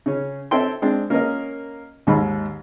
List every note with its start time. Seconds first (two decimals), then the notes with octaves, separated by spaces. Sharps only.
0.06 C#3 C#4
0.51 C4 A4 C#5 E5 G5 C6
0.82 G#3 C4 D4
1.10 A#3 C#4 A#4 D#5
2.07 D#2 G#2 B5